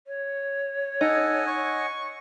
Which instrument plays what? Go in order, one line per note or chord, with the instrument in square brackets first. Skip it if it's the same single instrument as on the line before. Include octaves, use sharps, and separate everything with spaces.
[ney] C#5
[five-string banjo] D#4 [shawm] A4 [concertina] D#5 F#5 G#5
[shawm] C#6